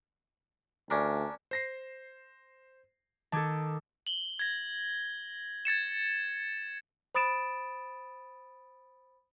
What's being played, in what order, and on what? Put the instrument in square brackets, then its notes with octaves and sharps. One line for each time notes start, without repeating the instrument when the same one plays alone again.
[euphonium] D2 [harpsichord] C#4 D4 A#4
[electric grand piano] C5 A#6 C7
[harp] D#3 A4 [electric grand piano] A5 D6 G#6
[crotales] F#7 G7
G#6 A#6
G#6 A6 C#7 E7
[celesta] C5 B5 D#6 A6 D7 E7